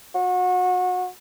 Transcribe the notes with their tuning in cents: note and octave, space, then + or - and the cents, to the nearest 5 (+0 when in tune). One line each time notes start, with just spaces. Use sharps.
F#4 -30